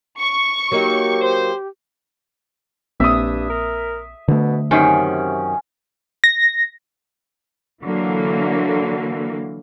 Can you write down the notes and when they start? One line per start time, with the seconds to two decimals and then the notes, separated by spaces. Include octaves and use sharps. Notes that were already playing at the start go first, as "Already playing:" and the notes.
0.18 C#6
0.72 F#3 A#3 D#4 G4
1.22 C5
3.00 A#1 G2 A#3 C4 E5 D#6
3.50 A#4
4.28 B2 D3 A3
4.71 F#2 C3 D#3 C#4
6.24 A#6
7.83 D3 E3 F#3 A#3